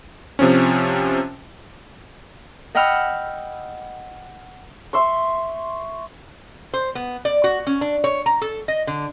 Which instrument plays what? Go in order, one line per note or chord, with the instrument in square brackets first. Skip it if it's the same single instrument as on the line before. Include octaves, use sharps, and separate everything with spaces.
[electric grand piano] C3 F3 C4 C#4
[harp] D#5 F#5 G5 B5 E6 F6
[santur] E5 C6 C#6
[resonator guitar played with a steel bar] C5
B3
D5
F#4
C#4
D4
C#5
A#5
A4
D#5
D3